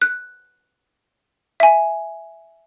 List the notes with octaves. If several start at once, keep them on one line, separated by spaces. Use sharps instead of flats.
F#6
E5 G#5